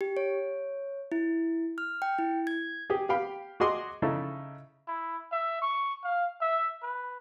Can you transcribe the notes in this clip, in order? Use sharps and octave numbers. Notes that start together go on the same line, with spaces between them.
G4
C#5
E4
F6
G5
E4
G#6
G4 G#4
G4 F5 G5 B5
F#4 G#4 D#5 C6 D6
C#3 D#4 E4 A4
E4
E5
C#6
F5
E5
B4